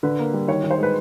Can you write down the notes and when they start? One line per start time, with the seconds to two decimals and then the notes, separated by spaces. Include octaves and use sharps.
0.03 D3 B4
0.19 A#3
0.33 G3
0.48 D#3 C#5
0.64 D#3
0.71 C5
0.78 G#3 B4